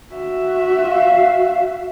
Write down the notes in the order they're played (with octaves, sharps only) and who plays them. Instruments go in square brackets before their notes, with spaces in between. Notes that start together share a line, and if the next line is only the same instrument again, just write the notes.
[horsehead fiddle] F#4 E5
[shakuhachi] F5